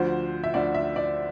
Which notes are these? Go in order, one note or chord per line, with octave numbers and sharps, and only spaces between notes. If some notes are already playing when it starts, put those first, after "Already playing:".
Already playing: D2 D3 F3 C5
E5
D2 D3 F3 D5
E5
D5